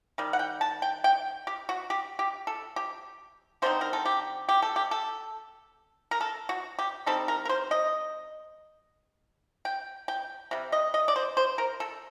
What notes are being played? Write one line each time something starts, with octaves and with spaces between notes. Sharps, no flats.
D#3 G3
F#5
G5
A5
G5
G5
G4
F#4
G4
G4
A4
G4
D3 G3 C4 D#4 C5
A#4
A4
G4
G4
A4
G4
A4
A#4
A4
F#4
G4
G3 C4 D#4 A4
A#4
A#4
C5
D#5
G5
G5
C3 G3
D#5
D#5
D5
C5
C5
A#4
A4